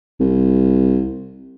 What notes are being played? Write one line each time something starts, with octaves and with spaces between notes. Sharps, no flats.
C2